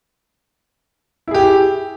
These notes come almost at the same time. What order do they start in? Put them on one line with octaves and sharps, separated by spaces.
E4 G#4 G4